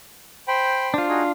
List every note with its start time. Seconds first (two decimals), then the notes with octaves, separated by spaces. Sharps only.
0.48 C5 G5 B5
0.94 D4 F4 C5
1.08 D#4 F#4 G#4